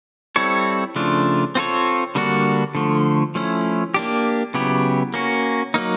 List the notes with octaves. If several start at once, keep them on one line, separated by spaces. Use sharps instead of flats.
G3 C4 E4 A4 C#5
C#3 F3 A3 D4 F4
C4 F4 A4 C#5
D3 G3 A#3 D4 F#4
D3 F3 A3
F3 A3 C#4 E4
A#3 D4 G4
C#3 F#3 B3 E4 G4
A#3 C#4 F#4
F#3 A#3 D#4